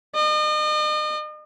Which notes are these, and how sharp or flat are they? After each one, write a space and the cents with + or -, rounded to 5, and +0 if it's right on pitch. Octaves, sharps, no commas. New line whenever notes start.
D#5 -40